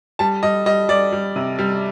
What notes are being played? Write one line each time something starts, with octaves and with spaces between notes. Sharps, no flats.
G3 A5
G3 D#5
G3 D#5
G3 D5
G3
C3
G3